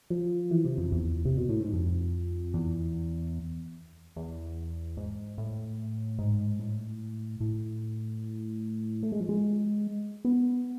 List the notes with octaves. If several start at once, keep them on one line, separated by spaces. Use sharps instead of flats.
F3
E3
C3
F2
E2
C3
B2
A2
G#2
F2
E2
E2
G#2
A2
G#2
A2
A2
A3
G#3
F3
G#3
B3